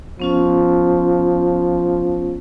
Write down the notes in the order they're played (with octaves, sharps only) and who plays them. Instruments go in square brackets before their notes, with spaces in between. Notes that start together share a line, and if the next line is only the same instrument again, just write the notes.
[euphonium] F3 [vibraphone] B3 C#4 F4